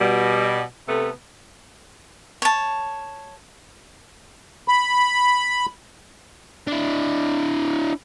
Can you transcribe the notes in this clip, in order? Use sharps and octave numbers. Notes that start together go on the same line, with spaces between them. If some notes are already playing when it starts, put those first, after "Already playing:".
B2 G3
C3 A3 B3 A4
C#5 A5
B5
D4 E4